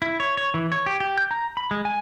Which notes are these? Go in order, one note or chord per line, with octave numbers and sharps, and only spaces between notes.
E4
C#5
C#5
E3
C#5
G4
G4
G6
A#5
B5
G#3
G#5